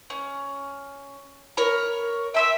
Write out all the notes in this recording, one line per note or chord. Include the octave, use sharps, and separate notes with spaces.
C#4
A#4 C#5 B5
E5 G5 C6 E6